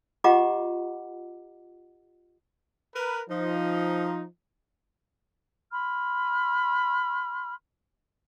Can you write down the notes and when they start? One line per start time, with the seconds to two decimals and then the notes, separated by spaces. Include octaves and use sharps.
0.24 F4 G4 D#5 F#5 A#5 D6
2.95 A#4 B4
3.30 F3 D#4
5.72 B5 C6 F6